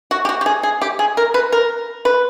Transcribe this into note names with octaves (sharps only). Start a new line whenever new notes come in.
F#4
G4
F#4
G4
G#4
G#4
G4
G#4
A#4
B4
A#4
B4